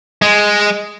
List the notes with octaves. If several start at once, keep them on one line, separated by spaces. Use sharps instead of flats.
G#3